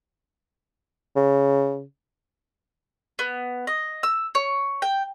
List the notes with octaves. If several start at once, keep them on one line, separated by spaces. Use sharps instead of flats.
C#3
B3
D#5
E6
C#5
G5